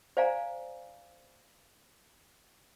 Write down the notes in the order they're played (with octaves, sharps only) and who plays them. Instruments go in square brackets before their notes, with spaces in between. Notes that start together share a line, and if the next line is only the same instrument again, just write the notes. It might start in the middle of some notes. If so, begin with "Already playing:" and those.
[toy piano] C5 D5 F5 G#5 A#5